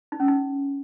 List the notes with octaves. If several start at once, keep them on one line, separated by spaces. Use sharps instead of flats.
D#4
C#4
D#4